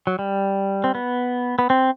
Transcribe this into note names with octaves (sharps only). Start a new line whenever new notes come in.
F#3
G3
C4
B3
B3
C4